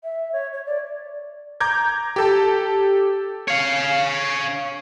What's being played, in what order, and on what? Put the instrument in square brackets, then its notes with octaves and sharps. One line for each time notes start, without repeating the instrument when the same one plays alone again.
[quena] E5
C#5
C#5
D5
[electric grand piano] A#5 D6 G6 G#6
G4 A4 A5
[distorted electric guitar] C#5 F5